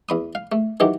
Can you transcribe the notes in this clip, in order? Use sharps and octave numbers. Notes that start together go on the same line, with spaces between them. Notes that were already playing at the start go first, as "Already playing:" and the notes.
E2 B5 D#6
F5
A3
D#3 E3 F#3 G4